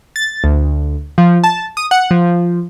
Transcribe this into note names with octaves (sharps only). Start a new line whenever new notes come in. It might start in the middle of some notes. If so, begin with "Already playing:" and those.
A6
D2
F3
A5
D#6
F#5
F3